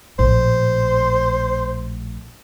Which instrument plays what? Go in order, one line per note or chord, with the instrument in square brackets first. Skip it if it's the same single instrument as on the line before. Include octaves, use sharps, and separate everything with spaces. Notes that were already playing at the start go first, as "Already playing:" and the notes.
[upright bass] A#1 A2 [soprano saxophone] C5